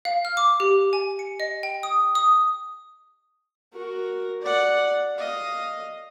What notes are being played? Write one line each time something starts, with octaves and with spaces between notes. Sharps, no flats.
F5
F6
D6
G4
G#5
C#7
D#5
G5
D#6
D#6
F#4 A#4
D5 F#5
D#5 F5